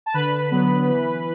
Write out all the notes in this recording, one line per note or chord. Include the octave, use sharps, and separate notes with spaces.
A5
D3 B4 B5
F#3 B3
E3